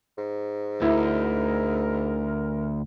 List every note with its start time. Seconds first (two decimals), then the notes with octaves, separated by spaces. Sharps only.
0.18 G#2
0.82 D2 E4 A#4